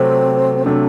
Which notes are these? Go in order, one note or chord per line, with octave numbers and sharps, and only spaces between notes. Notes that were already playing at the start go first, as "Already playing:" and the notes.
Already playing: C3 F#3 A3 C4
C3 F#3 A3 D4